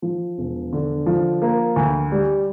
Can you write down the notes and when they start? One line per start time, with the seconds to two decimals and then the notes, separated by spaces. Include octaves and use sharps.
0.02 F3
0.38 E1
0.73 D3
1.06 F3
1.42 A#3
1.76 D2
2.12 G3